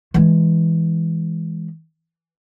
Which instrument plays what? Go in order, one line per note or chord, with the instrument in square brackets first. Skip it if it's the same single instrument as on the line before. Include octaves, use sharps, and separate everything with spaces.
[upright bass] E3 G#3